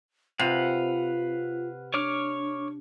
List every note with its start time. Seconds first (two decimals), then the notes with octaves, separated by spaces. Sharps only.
0.39 C3 F4 B4 F5 F#5
1.94 D4 C#5 D6 F6